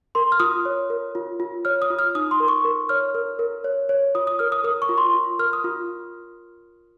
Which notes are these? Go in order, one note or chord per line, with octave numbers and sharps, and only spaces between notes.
A#4 C6
F6
F4 D#6
C#5
A#4
F4
F4
C#5 F6
D#6
F4
F6
D#4 D#6
C6
A#4
C#6
A#4
C#5 F6
A#4
A#4
C#5
C#5
F4 D#6
D#6
A#4 F6
D#6
A#4 D#6
C#6
F4
C6
F4
A#4 F6
D#6
F4